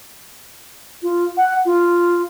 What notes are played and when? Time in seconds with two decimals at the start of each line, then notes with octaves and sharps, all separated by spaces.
1.03 F4
1.37 F#5
1.65 F4